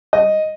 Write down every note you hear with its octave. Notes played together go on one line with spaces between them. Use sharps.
D#5